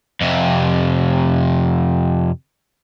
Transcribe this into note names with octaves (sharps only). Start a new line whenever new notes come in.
F2 C3